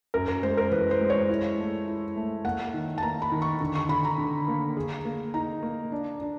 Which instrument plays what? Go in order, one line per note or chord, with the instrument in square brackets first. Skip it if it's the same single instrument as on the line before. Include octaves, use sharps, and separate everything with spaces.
[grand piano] F#2 [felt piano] A#4
[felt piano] A#4
[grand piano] G#3 [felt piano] C5
[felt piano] A#4
[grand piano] E3 [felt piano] B4
[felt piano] C5
[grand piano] G#3
[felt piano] C#5
[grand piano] E4
A3
E4
A3
[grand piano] A#3 [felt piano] F#5
[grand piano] D#3
[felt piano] A5
[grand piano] A#3 [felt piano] A#5
[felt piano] B5
[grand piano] D#3
[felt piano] C#6
[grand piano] D3
[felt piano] C#6
[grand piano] D3 [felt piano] B5
[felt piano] A#5
[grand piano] D3
A#3
G#4
A#3
[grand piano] D#4 [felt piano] A#5
[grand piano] A#3
D4
D4